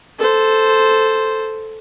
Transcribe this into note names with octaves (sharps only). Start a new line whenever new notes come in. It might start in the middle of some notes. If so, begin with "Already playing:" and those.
A4 C5